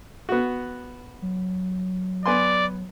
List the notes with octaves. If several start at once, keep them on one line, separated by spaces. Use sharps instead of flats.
B3 F#4
F#3
B3 D5 G#5 C6